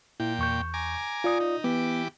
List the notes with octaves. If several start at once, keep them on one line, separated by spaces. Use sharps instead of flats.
A#2 E4 G5
E2 C#6 G6
G#5 A#5 D6
F4 D5 D#6
D#4
E3 B3 G4 D6